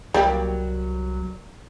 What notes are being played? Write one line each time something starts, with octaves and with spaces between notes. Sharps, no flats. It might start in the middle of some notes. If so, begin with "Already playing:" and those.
C2 F#3 G3 A#3 G4